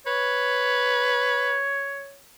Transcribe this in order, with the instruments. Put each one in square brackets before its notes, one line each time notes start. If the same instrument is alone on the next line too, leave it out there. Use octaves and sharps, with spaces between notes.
[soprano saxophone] B4 [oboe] C#5